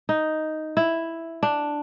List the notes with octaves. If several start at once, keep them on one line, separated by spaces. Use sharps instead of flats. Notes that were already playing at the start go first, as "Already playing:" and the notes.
D#4
E4
D4